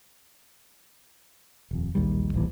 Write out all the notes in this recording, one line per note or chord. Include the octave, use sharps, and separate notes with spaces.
D#1 F2
A#1 D#2 D#3 G3
D1 A#1 D#2 E3